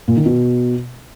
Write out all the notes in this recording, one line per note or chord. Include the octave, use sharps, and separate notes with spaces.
A#2
D#3
B2